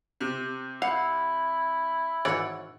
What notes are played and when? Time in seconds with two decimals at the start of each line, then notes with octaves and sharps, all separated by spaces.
0.20 C3
0.82 E4 F5 F#5
2.25 G#1 E3 C#5 D5 F#5